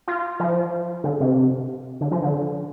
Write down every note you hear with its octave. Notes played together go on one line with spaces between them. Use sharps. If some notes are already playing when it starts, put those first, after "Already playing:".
F4
F3
D3
C3
D3
F3
D3